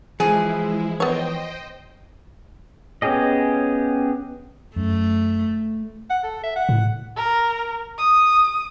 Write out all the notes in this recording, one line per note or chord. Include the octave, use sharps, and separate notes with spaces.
E3 F3 G#3 E4 G#4
B3 C5 C#5 D#5 G5
B3 C#4 G4 G#4 D#5
F#2 A3
F#5
A4
E5
F#5
A2
A#4
D#6